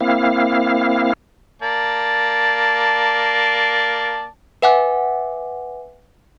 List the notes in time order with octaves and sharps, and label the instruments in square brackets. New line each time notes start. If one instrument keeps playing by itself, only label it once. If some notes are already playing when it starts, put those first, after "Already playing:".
[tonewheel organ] A#3 C4 E4 F5
[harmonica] A#3 D5 A5
[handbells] B4 E5 F#5 G#5 D6 F#6